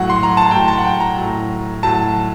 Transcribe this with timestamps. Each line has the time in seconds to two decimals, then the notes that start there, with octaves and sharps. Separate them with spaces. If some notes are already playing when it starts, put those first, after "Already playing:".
Already playing: A2 F#3 F#5
0.10 C6
0.23 A#5
0.37 A5
0.51 A2 F#3 G5
0.68 A5
0.78 F#5
0.85 G5
1.00 A#5
1.17 A2 F#3
1.83 A2 F#3 A5